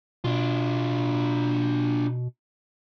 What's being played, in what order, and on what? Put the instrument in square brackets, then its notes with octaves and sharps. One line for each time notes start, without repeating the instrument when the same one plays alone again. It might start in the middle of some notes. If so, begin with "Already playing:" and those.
[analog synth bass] B2 [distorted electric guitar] D4 F4